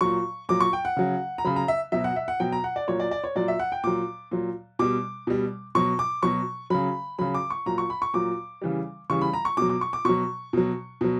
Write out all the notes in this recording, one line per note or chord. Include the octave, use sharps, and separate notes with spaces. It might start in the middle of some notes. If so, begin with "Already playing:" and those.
A#2 F#3 C#6
A#2 F#3 D6
C#6
G5
F#5
C#3 F#3
A#5
C#3 F#3 B5
A#5
E5
B2 F#3 E5
F#5
E5
F#5
B2 F#3 G5
A#5
F#5
D5
A#2 F#3 C#5
D5
D5
C#5
A#2 F#3 D5
E5
F#5
G5
A#2 F#3 D6
A#2 F#3
B2 G3 D6
B2 G3
B2 F#3 C#6
D6
B2 F#3 C#6
C#3 F#3 B5
C#3 F#3 B5
D6
C#6
A#2 F#3 A#5
C#6
B5
C#6
A#2 F#3 D6
C#3 E3 G3
C#3 E3 G3 C#6
B5
A#5
C#6
B2 F#3 D6
D6
C#6
D6
B2 F#3 C#6
B2 F#3
B2 F#3